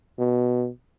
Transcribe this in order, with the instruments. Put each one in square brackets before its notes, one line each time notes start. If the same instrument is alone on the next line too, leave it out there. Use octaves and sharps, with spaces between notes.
[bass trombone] B2